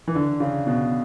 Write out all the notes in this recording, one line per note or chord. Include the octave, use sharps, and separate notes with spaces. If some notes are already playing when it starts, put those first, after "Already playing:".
E3
D3
C#3
B2